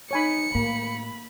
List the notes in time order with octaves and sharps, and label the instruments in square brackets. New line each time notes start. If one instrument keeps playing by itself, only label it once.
[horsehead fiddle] D#4 [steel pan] C#5 G#5 B5 [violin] C#7
[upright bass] A2 [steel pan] A#3 [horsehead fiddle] B5